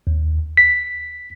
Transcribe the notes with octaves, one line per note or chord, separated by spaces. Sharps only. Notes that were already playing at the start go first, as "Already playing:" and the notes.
D#2
B6